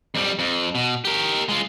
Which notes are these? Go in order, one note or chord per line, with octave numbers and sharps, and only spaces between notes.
F2 G3
F2
B2
G4 A#4
G#3 F4